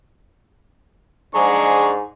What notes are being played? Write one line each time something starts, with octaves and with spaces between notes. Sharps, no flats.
G#2 D4 G#4 A#5 C#6